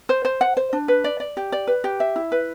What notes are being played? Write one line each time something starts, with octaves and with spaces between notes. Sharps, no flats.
C5
C5
F#5
C5
D4
B4
D5
D5
G4
D5
B4
G4
E5
E4
B4